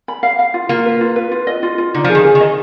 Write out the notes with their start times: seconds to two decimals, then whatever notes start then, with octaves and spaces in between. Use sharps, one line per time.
0.08 B5
0.23 F5
0.39 F5
0.54 F4
0.69 A#3 F4
0.86 B4
1.01 F4
1.16 B4
1.32 F4
1.47 D#5
1.63 F4
1.78 F4
1.94 D3 D#4
2.04 F3 G#4
2.15 D#3
2.25 G#4
2.35 D#3
2.40 D#5